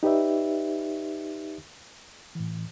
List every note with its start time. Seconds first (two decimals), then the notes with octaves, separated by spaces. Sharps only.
0.03 D#4 G4 B4 D5 E5
2.35 A2 E3